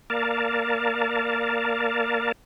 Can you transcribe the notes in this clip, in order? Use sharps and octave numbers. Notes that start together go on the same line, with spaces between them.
A#3 A#4 D5 F5 A5